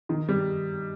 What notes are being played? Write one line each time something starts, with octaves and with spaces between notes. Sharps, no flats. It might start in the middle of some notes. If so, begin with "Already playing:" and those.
D#3
G3